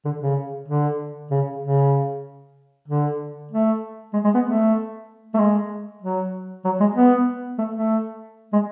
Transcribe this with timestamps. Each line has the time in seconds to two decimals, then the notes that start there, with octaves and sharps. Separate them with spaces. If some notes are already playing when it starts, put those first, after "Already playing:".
0.05 D3
0.21 C#3
0.68 D3
1.31 C#3
1.62 C#3
2.88 D3
3.51 A3
4.13 G#3
4.24 G#3
4.34 B3
4.45 A3
5.34 A3
5.38 G#3
6.02 F#3
6.65 F#3
6.80 G#3
6.95 B3
7.58 A3
7.74 A3
8.53 G#3